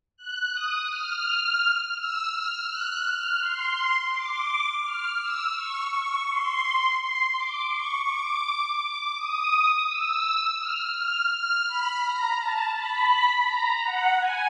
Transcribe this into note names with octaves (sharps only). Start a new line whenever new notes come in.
F#6
D#6
F6
E6
F6
F#6
F6
C6
D6
F6
E6
C#6
C#6
C6
C6
D6
C#6
D6
D6
D#6
E6
F6
F6
F6
B5
A#5
A5
B5
A#5
F#5
G#5